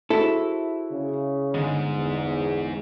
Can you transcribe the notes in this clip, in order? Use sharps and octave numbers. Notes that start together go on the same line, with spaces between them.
E4 F#4 G#4 A4 C5
C#3
G1 G#2 G#3
E2